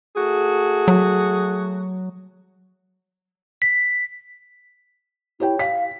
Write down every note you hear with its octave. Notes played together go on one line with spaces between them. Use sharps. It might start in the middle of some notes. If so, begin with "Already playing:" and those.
A3 F#4 G#4
F#3
B6
E4 G4 C#5 G5
F5 B6